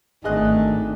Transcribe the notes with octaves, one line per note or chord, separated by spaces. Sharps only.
G#1 D#3 A3 D4 G#4 D#5 F#6